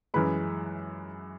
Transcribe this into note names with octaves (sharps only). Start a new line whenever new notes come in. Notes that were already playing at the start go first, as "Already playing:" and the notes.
F#2 E3 G#3 B4 B5